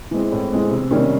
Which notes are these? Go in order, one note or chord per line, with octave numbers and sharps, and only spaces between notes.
E3 G#3 C4
A2
E3 G#3 C4
C3
D#3 G3 A#3 C#4